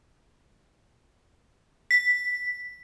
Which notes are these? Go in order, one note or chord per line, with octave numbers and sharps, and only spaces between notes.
B6